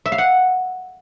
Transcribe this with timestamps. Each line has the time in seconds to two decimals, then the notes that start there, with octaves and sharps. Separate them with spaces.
0.06 E5
0.12 F5
0.18 F#5